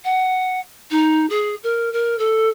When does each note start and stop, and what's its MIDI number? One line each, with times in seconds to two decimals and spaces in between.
0.05 0.60 78
0.91 1.26 63
1.30 1.55 68
1.64 1.92 70
1.93 2.18 70
2.19 2.49 69